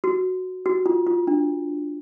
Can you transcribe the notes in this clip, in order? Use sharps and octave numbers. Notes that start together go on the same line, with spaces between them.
F#4
F#4
F4
F4
D4